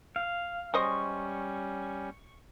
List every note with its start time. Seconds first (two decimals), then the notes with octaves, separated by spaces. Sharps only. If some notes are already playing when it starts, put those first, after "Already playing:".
0.16 F5
0.74 G3 G#3 C#4 C5 D#5 C#6